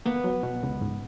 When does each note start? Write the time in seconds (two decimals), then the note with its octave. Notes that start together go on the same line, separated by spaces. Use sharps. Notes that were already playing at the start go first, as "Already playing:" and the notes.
0.05 A#3 B3
0.24 F#3
0.43 B2
0.63 C#2
0.81 G#2